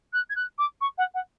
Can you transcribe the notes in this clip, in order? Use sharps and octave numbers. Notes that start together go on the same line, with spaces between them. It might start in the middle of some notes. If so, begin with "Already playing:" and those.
F#6
G#6
F#6
D6
C#6
F#5
F#5